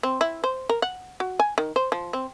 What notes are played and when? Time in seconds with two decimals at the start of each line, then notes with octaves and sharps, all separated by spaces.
0.03 C4
0.21 E4
0.44 C5
0.69 A#4
0.82 F#5
1.20 F#4
1.39 G#5
1.58 D#3
1.76 C5
1.92 F3
2.13 C4